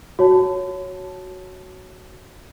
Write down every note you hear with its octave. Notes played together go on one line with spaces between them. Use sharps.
F#4 C#5 A5